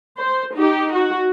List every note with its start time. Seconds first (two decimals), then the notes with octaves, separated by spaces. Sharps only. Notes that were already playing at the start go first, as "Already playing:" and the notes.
0.20 C5
0.55 D#4 G4
0.92 F#4